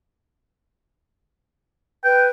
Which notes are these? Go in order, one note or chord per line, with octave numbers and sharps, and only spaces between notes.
B4 G5